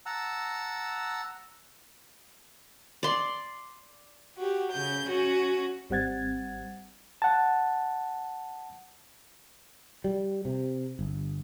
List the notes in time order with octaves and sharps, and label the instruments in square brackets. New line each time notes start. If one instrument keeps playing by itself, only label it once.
[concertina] F#5 A5 A#5 E6
[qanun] D5 C6
[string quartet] F#4 G4
C#3 G6
C#4 F#4
[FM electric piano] G#1 G3 C4 F#5 G#6 A6
[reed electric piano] F#5 A5
[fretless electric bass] G3
C3
G1